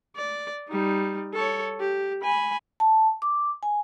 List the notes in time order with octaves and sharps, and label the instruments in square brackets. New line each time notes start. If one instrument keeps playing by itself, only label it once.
[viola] D5
G3 D#4
A4 C#5
G4
G#5 B5
[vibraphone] A5
D6
G#5